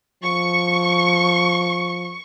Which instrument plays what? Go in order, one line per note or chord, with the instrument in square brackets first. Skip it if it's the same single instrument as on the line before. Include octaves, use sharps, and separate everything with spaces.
[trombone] F3 [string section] C#6